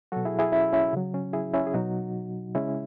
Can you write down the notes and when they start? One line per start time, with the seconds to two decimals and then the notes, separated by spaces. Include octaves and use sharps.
0.12 B2 F#3 F#4 A4
0.25 E4 G#4
0.39 E4 G#4
0.52 C#4 E4
0.73 C#4 E4
0.93 C#3 F#3
1.14 C#4
1.33 E4 G#4
1.53 C#4 E4
1.67 G#4
1.74 B2 F#3 D#4 F#4
2.55 C#3 G#3 C#4 E4